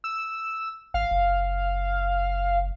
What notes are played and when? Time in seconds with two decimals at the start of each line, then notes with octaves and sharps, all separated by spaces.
0.04 E6
0.94 G#1 F5
1.11 F#1